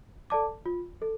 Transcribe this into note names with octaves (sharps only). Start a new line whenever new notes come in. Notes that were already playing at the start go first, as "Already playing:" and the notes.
A4 D5 A5 D6
F4
A4